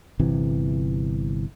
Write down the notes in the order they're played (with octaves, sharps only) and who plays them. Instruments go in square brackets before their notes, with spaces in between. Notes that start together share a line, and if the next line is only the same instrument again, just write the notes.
[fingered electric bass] G1 C3 E3